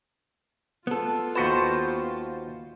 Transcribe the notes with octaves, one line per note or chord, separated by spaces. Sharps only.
B3 F4 A4
D#2 F#4 B4 C5 A5